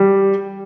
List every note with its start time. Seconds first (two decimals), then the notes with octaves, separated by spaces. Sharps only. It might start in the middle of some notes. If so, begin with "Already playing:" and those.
Already playing: G3